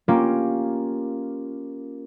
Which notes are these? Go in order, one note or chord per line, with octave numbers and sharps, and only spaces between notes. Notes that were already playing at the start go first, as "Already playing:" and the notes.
A#3 C#4 F4 G4